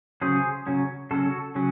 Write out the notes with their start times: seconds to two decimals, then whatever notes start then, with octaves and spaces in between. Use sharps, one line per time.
0.21 C#3 F#3 C#4 G#4 C5
0.67 C#3 F#3 C#4
1.11 C#3 F#3 C#4 F#4 A4
1.55 C#3 F#3 C#4